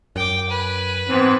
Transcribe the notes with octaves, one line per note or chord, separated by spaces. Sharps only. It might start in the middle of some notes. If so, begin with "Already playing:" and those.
F#2 G5 D6
B4 G#5
G#2 E3 B3 C4